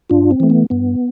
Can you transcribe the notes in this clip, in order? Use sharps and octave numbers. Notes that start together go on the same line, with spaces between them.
G2 D4 F4
C4
E3 A3
B3
G2 B3